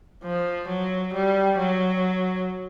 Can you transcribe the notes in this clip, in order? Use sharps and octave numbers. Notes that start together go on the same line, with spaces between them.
F3
F#3
G3
F#3